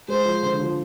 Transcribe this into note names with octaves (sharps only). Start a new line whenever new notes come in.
G#3 C5
F3
D3
F3